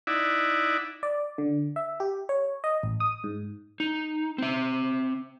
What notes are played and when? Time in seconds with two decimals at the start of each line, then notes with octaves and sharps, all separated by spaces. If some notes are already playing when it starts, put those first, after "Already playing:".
0.07 D#4 E4 D5 E5 F#5
1.03 D5
1.38 D3
1.76 E5
2.00 G4
2.29 C#5
2.64 D#5
2.83 A1
3.00 D#6
3.24 G#2
3.80 D#4
4.38 C4 E5